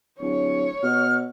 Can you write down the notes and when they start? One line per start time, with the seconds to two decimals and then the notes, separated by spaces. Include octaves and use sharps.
0.20 D1 C#5
0.83 B2 F6